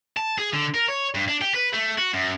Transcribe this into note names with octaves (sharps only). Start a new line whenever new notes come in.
A5
G#4
D3
A#4
C#5
G2
D4
G4
B4
A3
F#4
F#2